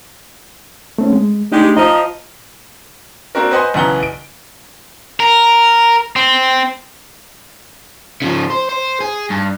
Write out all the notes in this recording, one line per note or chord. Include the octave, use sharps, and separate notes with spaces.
A3 C4 C#4
G#3
G#3 A3 D4 D#4 G4
F3 D#5 A#5
A#3 C4 D4 F#4 A#4
B4 C5 D#5 F#5 G#5 C6
B1 C#3 E3 F#5 A#5 G7
D7
A#4
C4
C#3 F3
C5
C5
G#4
G2